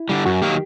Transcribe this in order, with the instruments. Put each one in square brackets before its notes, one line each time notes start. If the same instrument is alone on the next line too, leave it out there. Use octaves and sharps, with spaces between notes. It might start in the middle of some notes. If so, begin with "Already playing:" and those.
Already playing: [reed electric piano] E4
[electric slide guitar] D3 G3
[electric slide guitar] F#2 [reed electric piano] F#4
[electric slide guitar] D#3 F#3 A#3 [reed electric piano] G4